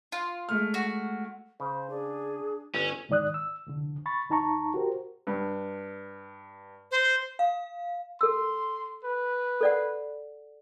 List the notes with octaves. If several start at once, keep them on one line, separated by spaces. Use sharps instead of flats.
F4
G#3 A3 F6
F#4
C#3 C5
D4 G#4
G1 C#4
D#2 G#2 D#3 D5 D#6 F#6
E6
C2 F2 D3
B5 C#6 A6
D#2 D#4 A5 A#5 C#6
F#4 G4 A#4 C5
G2
C5
F5
A4 C6 E6
B4
A4 D5 F#5